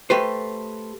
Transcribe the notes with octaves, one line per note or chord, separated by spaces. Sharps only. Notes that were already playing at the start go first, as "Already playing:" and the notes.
A3 G4 B4 C5